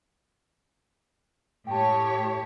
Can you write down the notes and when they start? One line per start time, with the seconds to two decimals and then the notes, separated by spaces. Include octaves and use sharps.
1.67 A2 G4 C#5 G5 A5